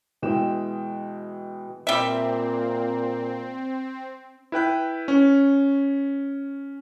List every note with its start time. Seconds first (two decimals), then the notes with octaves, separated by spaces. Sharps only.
0.22 B2 E3 G#3 G5 E7
1.87 A#2 G3 C4 E5
4.52 E4 B4 G5 F#6
5.08 C#4